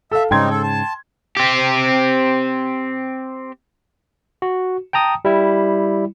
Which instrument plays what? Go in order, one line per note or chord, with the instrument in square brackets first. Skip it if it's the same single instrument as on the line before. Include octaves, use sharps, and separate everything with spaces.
[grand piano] A4 F5 [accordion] E5
[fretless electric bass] G#2 C#3 [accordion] G3 C4 D#4 [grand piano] G5 C6 G#6
[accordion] A4
A5
[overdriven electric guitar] C4 G4
[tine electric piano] F#4
G5 A5 A#5 D#6
G3 E4